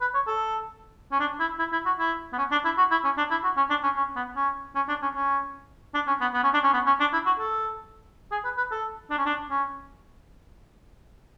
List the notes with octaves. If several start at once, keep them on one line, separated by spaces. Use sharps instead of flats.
B4
C#5
A4
C#4
D4
E4
E4
E4
F#4
E4
B3
C#4
D4
E4
F#4
E4
C#4
D4
E4
F#4
C#4
D4
C#4
C#4
B3
C#4
C#4
D4
C#4
C#4
D4
C#4
B3
B3
C#4
D4
C#4
B3
C#4
D4
E4
F#4
A4
G#4
B4
B4
A4
D4
C#4
D4
C#4